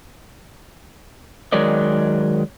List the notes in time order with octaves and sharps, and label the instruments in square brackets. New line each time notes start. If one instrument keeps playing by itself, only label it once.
[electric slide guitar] D#3 F#3 G#3 A#4 D5 D#5